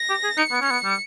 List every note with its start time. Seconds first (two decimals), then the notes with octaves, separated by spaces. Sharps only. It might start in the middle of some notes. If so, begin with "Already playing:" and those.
Already playing: A#6
0.10 G4
0.24 G#4
0.38 D#4 C#7
0.52 B3
0.61 C#4 C#7
0.71 B3
0.84 G3